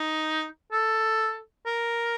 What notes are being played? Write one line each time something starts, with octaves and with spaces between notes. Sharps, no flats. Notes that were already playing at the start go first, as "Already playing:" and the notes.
Already playing: D#4
A4
A#4